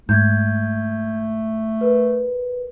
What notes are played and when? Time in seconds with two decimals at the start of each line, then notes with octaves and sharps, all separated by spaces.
0.09 G#2 A3 G6 G#6
1.81 A#4 B4